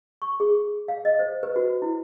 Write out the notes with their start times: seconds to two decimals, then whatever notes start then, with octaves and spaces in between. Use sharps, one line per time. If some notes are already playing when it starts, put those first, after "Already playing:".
0.22 C#6
0.40 G#4
0.88 F5
1.05 D#5
1.19 C5
1.43 B4
1.56 F#4
1.82 E4